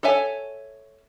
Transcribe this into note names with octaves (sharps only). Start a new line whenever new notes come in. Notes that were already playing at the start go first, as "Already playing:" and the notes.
A4 C#5 E5 G#5